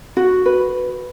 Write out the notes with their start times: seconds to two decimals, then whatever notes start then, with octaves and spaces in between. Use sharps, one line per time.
0.17 F#4
0.46 B4